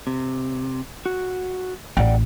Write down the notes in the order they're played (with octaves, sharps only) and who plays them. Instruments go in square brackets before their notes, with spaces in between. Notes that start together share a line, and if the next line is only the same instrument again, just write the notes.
[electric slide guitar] C3
F#4
[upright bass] A1 [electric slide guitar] D5 F#5 G5